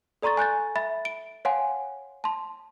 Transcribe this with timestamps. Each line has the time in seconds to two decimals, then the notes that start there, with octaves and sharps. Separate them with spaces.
0.22 A4 D5 A#5 C6 C#6 A6
0.37 G#5 F#6 G6 A6
0.75 E5 B5 A6
1.05 D7
1.45 C#5 F5 F#5 G#5 C6
2.24 A5 C6